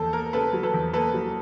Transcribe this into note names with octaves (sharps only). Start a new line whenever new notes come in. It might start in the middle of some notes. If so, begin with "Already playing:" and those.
Already playing: E2 A#3 A4 C5
A#3 A#4
C#3 A4 B4
F#3
A4 B4
E2
A#3 A4 B4
F#3